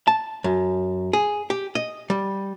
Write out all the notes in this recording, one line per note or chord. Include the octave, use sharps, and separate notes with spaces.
A5
F#2
G#4
G4
D#5
G3